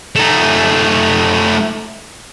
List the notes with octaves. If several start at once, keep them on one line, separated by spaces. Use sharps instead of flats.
A3 D#4